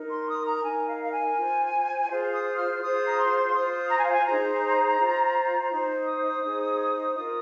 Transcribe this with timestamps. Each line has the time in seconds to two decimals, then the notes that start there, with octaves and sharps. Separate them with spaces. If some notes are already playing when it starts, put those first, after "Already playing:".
Already playing: D#4 A#4
0.10 C6
0.28 D#6
0.46 A#5
0.64 D#4 A#4 G#5
0.88 F5
1.04 F5
1.12 G#5
1.37 F4 C5
2.09 F4 G#4 C5
2.33 D#6
2.57 F6
2.81 F4 G#4 C5 D#6
3.05 A#5
3.18 C6
3.53 F4 C5 D#6
3.90 A#5
3.98 G#5
4.06 F5
4.12 G#5
4.26 D#4 G#4 C5 A#5
4.98 F4 C5
5.71 D#4 C5
6.07 D#6
6.43 D#4 G#4 C5
7.16 F4 A#4 D#6